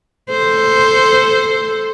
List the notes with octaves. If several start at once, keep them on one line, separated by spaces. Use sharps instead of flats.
A4 C5